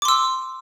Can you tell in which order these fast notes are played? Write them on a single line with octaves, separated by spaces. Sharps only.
D6 C6 E6